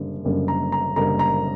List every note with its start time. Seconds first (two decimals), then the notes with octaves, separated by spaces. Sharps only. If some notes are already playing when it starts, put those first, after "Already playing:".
Already playing: F#1 F#2 D3 G3 A#3
0.25 F#1 F#2 D3 G3 A#3
0.48 A#5
0.72 A#5
0.96 F#1 F#2 D3 G3 A#3 A#5
1.19 A#5